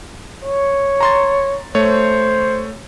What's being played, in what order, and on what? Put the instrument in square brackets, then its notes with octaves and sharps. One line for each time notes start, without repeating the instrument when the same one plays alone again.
[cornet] C#5
[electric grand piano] A#5 C6 A6
[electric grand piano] A3 C#5 [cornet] C5